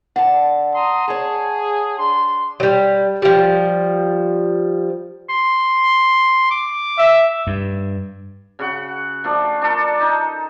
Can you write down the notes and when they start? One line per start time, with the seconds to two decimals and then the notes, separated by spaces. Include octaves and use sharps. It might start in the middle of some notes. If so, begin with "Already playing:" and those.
0.16 D3 F#5 A5
0.74 A#5 C6 D#6
1.08 G#4 C#5 A5
1.98 D4 C6
2.60 F#3 G3
3.22 F3 G3
5.30 C6
6.51 D6
6.99 E5
7.47 G2
8.59 C#3 F#4 F#5
9.24 F3 A3 D4
9.62 D4 A4 A#4
10.00 D#4